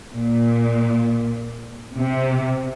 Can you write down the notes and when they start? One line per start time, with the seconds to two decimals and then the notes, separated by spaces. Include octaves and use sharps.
0.14 A#2
1.96 C3